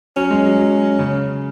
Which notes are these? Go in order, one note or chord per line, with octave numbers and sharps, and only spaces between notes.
F#3 C#4
G#3
F#3
F#3
C#3